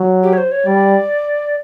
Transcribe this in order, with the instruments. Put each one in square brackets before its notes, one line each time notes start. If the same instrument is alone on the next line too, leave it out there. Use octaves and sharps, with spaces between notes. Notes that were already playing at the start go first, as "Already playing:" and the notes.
Already playing: [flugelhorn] F#3
[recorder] G4
C#5
C5
C#5
[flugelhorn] G3 [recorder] D5